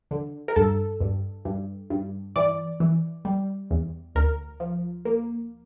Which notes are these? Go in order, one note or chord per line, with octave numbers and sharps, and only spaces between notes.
D3
A#4
G2 A4
G2
G2
G2
E3 D5
E3
G3
E2
D2 A#4
F3
A#3